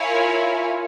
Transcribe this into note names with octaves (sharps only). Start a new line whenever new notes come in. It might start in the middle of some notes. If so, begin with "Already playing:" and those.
Already playing: E4 A#4 C#5 F5 G#5
F4